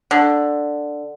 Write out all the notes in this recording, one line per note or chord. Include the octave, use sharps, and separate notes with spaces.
D3